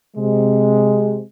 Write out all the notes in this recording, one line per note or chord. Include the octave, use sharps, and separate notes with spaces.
C3 G#3